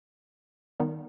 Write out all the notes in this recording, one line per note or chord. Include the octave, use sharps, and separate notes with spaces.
D#3 G3 B3 D#4